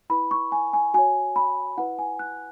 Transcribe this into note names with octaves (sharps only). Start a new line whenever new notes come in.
E4 B4 B5
C#6
G#5
G#5
F#4 C#5 G#5
B5
E4 B4 F#5
G#5
F#6